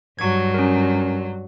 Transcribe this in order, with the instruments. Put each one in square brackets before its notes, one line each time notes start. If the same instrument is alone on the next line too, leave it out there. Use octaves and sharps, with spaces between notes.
[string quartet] G2 F#3 [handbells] C#6 G#6
[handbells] C#4 A#4